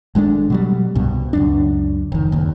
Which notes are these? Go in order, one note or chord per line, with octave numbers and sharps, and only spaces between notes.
G#1 G#3 A3 D4
B2 F#3 G3
C2 G2 B2
C#2 F#2 D4
F1 D#3
F#1 D#2